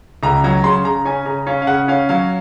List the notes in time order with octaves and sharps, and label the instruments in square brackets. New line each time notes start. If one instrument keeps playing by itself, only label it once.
[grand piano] C#2 A#5
F#3 A#5
C#3 C6
C#3 A#5
C#4 G#5
C#3 A#5
C#4 F5
F5
C#3 F#5
C#4 F5
F#3 F5